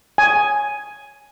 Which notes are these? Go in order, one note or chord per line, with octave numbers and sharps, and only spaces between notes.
G#5